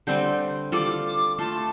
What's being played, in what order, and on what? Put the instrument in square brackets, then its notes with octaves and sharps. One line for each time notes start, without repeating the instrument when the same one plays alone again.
[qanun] D3 G3 C4 [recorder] G6
[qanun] G3 F4 A4 [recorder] D6
[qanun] A3 F4 A4 [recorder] A5